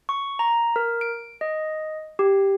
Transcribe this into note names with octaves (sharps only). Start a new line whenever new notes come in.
C#6
A#5
A#4
D7
D#5
G4